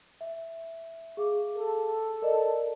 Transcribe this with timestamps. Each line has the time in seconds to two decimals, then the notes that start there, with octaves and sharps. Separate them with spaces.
0.21 E5
1.17 G#4 F5 D6
1.57 A4
2.22 A#4 D5 D#5